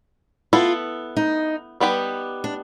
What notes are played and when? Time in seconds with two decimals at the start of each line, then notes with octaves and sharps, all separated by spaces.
0.53 B3 E4 F4 A4
1.17 D#4
1.80 G3 B3 D#4 G4 B4
2.44 D4